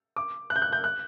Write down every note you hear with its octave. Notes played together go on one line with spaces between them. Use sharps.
D6
F#6
G6
F#6
G6
F#6